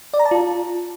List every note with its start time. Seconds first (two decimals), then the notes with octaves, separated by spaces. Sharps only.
0.14 D5
0.19 A#5
0.25 A5
0.31 F4